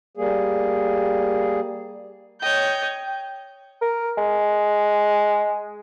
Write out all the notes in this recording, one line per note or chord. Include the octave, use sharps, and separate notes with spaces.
G3 A#3 G#4
C#5 D#5 G5 G6
A#4
G#3